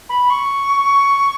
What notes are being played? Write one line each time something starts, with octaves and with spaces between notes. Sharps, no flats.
B5
C#6